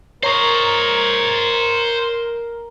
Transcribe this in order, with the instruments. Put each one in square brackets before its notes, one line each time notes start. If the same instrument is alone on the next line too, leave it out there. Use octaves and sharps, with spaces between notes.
[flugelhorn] A#4 [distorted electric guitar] C5 D#5 [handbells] C#5 A#5 C#6